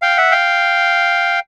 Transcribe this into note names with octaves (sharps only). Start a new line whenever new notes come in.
F5 G5
E5 F#5
F5 G5